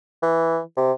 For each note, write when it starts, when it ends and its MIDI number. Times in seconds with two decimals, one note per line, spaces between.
0.22 0.60 52
0.77 0.92 48